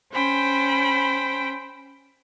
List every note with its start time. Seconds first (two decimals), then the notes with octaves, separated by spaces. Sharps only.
0.12 C#4 C5 G5 B5